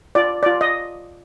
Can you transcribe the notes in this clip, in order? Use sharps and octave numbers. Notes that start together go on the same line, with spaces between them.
F4 D5
F4 D5
D#5